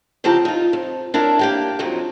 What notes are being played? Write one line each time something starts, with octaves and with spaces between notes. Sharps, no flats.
C#3 F3 E4 G4 A5 A#5
D#4 F4
F2
D4 E4 A#4 C#5
A#3 G4 G5
F2 F#3 D#4